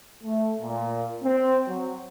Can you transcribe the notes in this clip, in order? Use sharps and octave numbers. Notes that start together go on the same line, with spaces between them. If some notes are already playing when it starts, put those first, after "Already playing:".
A3
A#2
C4
F#3